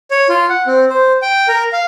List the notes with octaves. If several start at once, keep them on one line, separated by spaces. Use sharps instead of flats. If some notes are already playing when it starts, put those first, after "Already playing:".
C#5
F4
F#5
C4
C5
G5
A#4
F5